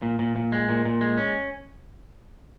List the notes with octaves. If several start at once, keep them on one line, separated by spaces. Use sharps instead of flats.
A#2
A#2
A#2
G#3
A#2
A#2
G#3
C#4